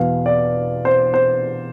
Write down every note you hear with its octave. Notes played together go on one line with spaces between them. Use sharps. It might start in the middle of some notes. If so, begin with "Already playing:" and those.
Already playing: E2 B2 B3 F5
D5
C5
C5